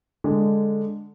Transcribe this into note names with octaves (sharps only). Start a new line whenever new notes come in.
D3 G#3